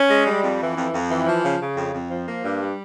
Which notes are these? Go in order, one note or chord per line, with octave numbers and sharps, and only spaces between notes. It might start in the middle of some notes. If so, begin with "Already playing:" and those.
Already playing: C#4
G#3
G3
F2
E3
F2
F2
E3
F3
C#3
C#3
F2
F2
F3
A#3
G2
G3